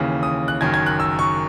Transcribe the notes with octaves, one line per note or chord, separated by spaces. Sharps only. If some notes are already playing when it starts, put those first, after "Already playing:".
Already playing: D#2 C#3 E3
D#6
F#6
F#1 F#2 D#3 G#6
G#6
F#6
E6
C#6